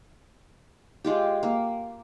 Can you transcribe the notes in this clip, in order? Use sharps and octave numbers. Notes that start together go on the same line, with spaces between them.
G#3 F4 G4
A#3